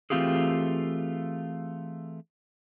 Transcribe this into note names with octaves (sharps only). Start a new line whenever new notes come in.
E3 A3 C4 F4 G4 G#4